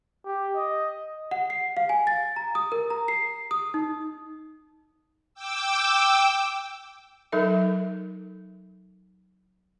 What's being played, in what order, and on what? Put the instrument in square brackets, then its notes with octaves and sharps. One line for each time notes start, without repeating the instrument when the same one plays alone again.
[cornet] G4
D#5
[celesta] F#5
C7
F5
G#5
A6
A#5
D#6
A#4
A#5
C7
D#6
D#4
[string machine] G5 D6 E6
[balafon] F#3 D#4 A4 A#4 E5